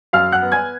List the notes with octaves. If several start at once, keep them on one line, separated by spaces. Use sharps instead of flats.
F#2 F5 F6
F#5 F#6
B3
G#5 G#6